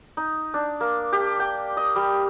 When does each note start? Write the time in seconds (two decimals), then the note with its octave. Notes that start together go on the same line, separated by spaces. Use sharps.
0.17 D#4
0.54 D4
0.80 A#3
1.13 G4
1.40 G5
1.77 D#5
1.96 G3